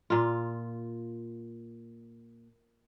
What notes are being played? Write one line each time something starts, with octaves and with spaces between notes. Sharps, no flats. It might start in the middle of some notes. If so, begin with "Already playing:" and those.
A#2 F4